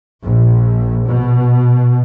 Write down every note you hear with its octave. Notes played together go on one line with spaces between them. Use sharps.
A#1
B2